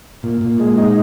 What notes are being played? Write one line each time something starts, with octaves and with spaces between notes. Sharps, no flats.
A#2
A#2
G#3
D#4